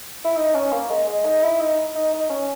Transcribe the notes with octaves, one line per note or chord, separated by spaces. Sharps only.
E4
D#4
C#4
A#3
G#3
G#3
D#4
E4
D#4
D#4
D#4
C#4